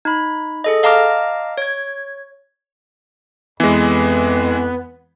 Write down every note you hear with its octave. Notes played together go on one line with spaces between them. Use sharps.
D#4 B5
G#4 A4 D#5
D#5 F5 A5 A#5 D6 F6
C#5 G#6
F2 E3 G#3 B3